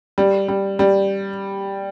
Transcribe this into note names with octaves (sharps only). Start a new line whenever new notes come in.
G3
G3
G3